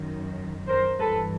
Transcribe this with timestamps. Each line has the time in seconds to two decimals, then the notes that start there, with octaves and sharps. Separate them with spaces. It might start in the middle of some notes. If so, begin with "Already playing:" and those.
Already playing: F#2 D#3
0.67 A#4 C5
0.97 G2 E3 A4 B4